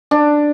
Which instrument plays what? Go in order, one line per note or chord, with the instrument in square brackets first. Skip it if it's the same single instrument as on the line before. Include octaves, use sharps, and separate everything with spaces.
[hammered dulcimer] D4